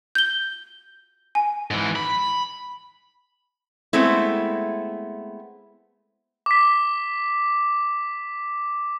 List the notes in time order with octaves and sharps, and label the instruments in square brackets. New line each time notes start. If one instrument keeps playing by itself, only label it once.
[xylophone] G6 G7
G#5
[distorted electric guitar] G#2 E3
B5
[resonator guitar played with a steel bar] G#3 A3 B3 C4 E4
[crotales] D6 B6